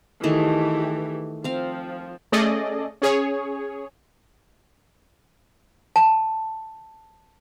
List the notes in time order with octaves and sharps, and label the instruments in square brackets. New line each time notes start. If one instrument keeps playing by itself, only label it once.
[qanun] D#3 A3 G#4 [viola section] E3 G4
[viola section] F3 [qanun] C4 F5
[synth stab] A3 C#4 G#4 A4 D5 D#5
C#4 G#4 C#5
[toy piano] A5